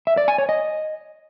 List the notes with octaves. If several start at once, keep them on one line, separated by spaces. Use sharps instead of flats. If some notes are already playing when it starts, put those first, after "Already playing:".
E5
D5
G#5
C#5
D#5